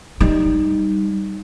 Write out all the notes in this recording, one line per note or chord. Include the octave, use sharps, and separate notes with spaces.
G3 D#4